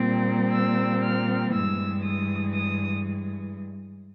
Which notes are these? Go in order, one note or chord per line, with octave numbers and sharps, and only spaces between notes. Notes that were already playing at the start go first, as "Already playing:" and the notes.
Already playing: A#2 G3 C4
E6
F6
G2 E3 G#3 E6
D#6
D#6